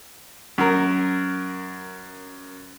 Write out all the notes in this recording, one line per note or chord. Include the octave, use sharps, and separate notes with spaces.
F#2 A#4